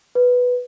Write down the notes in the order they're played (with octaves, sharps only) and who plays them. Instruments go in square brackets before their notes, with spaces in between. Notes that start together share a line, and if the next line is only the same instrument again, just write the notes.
[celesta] B4